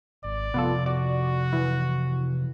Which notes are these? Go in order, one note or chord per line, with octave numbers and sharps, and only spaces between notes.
G#1 D5
C3 F3 B3 F4 A4
F#4 D5
E3